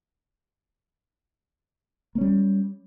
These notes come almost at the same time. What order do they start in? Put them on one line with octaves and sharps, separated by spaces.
A#3 C#4 G3